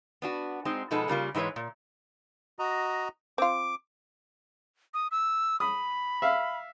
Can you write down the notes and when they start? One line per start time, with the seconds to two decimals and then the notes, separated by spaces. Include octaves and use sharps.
0.22 B3 D4 F#4
0.65 G#3 C4 D#4
0.91 B2 F3 G#3 B3 D#4 A4
1.08 C#3 G3 A#3 F4
1.35 G#2 E3 G#3 B4 C#5
1.56 A#2
2.59 F#4 D#5 A#5
3.38 C4 F4 D6
4.94 D#6
5.11 E6
5.60 B5 D#6
6.22 E5 F5